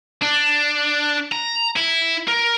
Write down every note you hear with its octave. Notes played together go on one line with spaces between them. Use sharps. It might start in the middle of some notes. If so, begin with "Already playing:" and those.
D4
A#5
E4
A#4